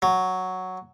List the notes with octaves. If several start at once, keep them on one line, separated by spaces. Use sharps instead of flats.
F#3